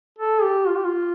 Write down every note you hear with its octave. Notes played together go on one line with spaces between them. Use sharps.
A4
G4
F4
G4
F4